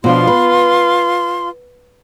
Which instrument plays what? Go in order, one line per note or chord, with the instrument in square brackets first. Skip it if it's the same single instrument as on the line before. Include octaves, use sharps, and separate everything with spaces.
[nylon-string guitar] B2 F3 D4 [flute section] F4 C6
[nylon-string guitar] B4